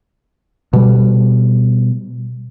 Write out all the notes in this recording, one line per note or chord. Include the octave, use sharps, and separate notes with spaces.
B2 G3